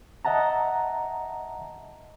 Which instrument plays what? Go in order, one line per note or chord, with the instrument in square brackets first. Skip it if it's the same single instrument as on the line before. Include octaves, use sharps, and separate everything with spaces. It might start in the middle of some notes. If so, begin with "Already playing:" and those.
[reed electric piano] D#5 E5 F#5 A5 A#5